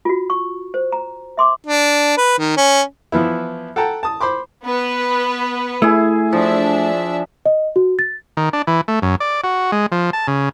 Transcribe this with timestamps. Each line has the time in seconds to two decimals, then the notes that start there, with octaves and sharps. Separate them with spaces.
0.05 F4 F#4
0.30 C#6
0.74 C5
0.92 A#5
1.37 E5 C6 D6
1.67 D4
2.17 B4
2.38 D#3
2.57 C#4
3.12 E3 F3 B3 E4
3.76 A4 F#5 G5 A5 A#5
4.03 A5 D#6
4.21 C5 B5 C6 D6
4.63 B3 B4
5.82 A3 E4 G#4
6.33 F3 D4 E5
7.46 D#5
7.76 F#4
7.99 A6
8.37 D#3
8.53 D4
8.67 E3
8.88 A3
9.02 F#2
9.20 D5
9.44 F#4
9.72 G#3
9.92 F3
10.13 A5
10.28 C#3